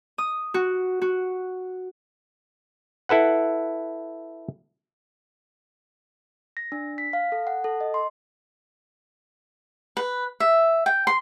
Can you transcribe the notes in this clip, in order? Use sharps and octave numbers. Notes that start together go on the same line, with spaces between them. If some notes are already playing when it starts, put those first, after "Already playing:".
D#6
F#4
F#4
E4 A4 B4 F#5
A#6
D4
B6
F5
A4
F#5
A4
D#5
C6
B4
E5
G5
C6